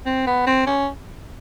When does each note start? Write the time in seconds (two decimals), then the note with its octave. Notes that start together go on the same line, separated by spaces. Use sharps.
0.06 C4
0.26 B3
0.46 C4
0.66 C#4